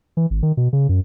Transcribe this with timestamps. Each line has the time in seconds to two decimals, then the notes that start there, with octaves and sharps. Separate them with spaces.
0.17 E3
0.30 G#1
0.43 D#3
0.57 B2
0.73 C#3
0.89 F#2